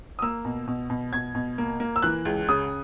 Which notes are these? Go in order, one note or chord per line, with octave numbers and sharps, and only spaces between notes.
D#6
A#3 E6
B2
B2
B2
B2 G#6
B2
A#3
A#3
E6
E3 F#6
C#2
C#3 D#6